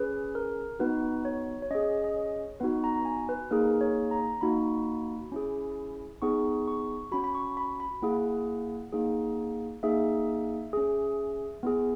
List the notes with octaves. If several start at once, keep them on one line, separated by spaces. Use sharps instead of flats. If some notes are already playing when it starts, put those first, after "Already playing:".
Already playing: C#4 G#4 B4
A#4
B3 D#4 F#4 B4
C#5
C#5
C#4 G#4 D#5
D#5
C#5
B3 D#4 F#4 B4
A#5
G#5
B4
A#3 D#4 G#4 A#4
C#5
A#5
A#3 D#4 F#4 B5
C#4 E4 G#4
B3 D#4 G#4 C#6
C#6
C#4 F#4 B5
B5
C#6
B5
B5
A#3 E4 G#4 F#5
A#3 D#4 G#4
A#3 D#4 G#4 E5
C#4 G#4
B3 E4 G#4